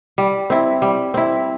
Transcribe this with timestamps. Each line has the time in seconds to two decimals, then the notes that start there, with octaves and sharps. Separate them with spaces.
0.18 G3
0.50 C4 E4
0.82 G3
1.14 C4 E4